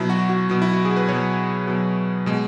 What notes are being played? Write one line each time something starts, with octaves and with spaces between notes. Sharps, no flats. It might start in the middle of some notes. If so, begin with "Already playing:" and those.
Already playing: B2 F#3 E4
F#4
F#4
B2 F#3
E4
F#4
G#4
B4
B2 F#3 C#5
B2 F#3
B2 G#3